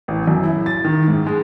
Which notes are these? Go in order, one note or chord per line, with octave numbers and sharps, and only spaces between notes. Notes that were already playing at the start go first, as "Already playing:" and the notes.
A1
F#2
E4
A6
D#3
G#2
G#3